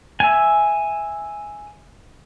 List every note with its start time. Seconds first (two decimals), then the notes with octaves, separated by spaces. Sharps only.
0.20 E5 G#5